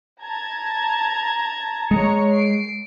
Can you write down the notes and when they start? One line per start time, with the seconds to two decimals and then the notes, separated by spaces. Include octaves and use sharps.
0.22 A5 A#5 G#6
1.91 G#3 C#5 A#5 C#7
2.32 C7 D7